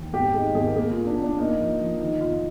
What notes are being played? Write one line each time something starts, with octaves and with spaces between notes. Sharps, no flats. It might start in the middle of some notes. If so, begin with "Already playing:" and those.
Already playing: D#2
G#1 G4
G#3 D#4
G#1 G#4
A#4
A#3 G#4
G#2 F4
D4
A#3
D4
A#3 D#4
F3
F3
D#3 D#4
F1 F4